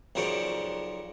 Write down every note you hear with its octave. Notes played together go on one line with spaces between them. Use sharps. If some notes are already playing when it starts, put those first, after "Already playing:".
B1 C#3 F3 A#4 D5 C#6